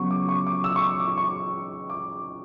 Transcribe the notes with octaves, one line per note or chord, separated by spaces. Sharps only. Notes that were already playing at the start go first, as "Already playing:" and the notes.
Already playing: C#3 F#3 B3 C#6
D6
C#6
D6
E6
C#6
D6
D6
C#6
D6